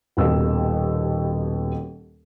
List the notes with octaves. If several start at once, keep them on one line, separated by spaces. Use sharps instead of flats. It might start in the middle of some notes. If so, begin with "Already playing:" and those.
D#1 D#2 B2 B3 E6